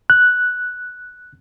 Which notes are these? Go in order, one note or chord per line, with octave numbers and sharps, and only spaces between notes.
F#6